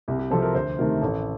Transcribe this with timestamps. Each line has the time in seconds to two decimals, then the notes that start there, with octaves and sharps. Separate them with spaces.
0.08 C2 G4
0.19 G4
0.31 C3 F3 C4 A4
0.42 A#4
0.55 D2 C5
0.79 C3 D#3 A3 A#4
1.02 A1 A4